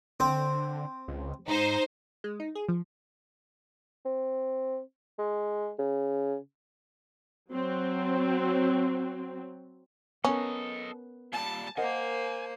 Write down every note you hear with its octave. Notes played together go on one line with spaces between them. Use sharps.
D3 C4
C#2
G#2 D#4 C5
G#3
D#4
G#4
F3
C4
G#3
C#3
F#3 C4
B3 C#4 A4 A#4 D#5
A#2 G3 A5
A#3 A#4 C5 D#5 F#5 G#5